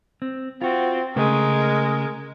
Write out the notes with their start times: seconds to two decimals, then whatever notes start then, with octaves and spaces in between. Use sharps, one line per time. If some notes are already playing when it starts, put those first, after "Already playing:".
0.22 C4
0.62 C4 F4 F#4
1.16 C#3 G#3 A3 A#4